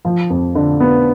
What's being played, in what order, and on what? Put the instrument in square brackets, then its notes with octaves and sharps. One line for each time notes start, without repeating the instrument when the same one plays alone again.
[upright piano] F3
F2
D3
B3